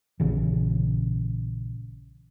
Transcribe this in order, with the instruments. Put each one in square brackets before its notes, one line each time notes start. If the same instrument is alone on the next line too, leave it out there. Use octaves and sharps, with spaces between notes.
[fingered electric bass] A#1 C#3 E3